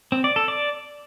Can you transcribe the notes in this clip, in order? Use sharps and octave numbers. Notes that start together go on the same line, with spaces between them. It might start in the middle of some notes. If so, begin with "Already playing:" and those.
C4
D5
A4
D5